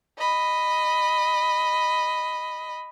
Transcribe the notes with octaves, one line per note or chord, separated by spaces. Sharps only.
D#5 B5